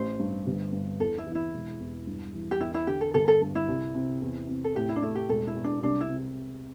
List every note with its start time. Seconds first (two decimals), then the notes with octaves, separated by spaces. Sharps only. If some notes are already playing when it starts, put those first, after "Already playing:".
Already playing: A1 C5
0.20 G2
0.46 G1
0.73 G2
1.00 E2 A4
1.18 E4
1.27 E3
1.35 E4
1.54 E1
1.80 E2
2.07 G2
2.34 E3
2.51 G4
2.60 E2 E4
2.74 E4
2.87 D3 G4
3.01 A4
3.14 G1 A4
3.28 A4
3.41 G2
3.55 E4
3.68 C2
3.95 C3
4.22 E2
4.48 C3
4.64 A4
4.75 A2 G4
4.89 E4
4.96 D4
5.02 A3 E4
5.15 G4
5.29 E1 A4
5.47 E4
5.56 E2
5.64 D4
5.83 C2 D4
6.01 E4
6.09 C3